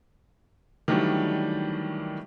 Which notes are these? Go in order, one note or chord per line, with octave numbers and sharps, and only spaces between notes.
D#3 E3 F#3 G3 A3 D4